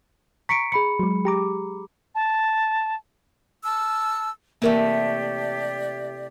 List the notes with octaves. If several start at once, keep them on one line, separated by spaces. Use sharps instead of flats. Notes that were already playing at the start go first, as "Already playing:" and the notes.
A#5 C#6 B6 C#7 D7
G#4 B5 C#7
F#3 G#3
G4 A#5 D6
A5
A5 E6 F6
C3 E3 A3 A#3 G4 A#4 D5 E5